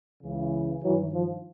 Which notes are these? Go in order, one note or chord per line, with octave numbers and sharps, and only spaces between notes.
C#2 C#3 E3
G2 D#3 E3 F#3
F3